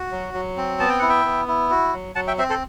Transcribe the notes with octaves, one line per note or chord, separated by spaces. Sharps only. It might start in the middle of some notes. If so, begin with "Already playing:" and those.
Already playing: F#4
F#3
F#3
C4
B3 A5
G5
E4 F#5
E5 G5
B3
E4
F#4
F#3
F#3 F#5 A5
E5 G5
C4 C5 E5
A4 C5